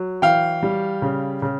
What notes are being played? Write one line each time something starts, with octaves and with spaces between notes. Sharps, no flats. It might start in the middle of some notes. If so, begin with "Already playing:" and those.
Already playing: F#3
E3 F5 G5
G3
C#3
C#3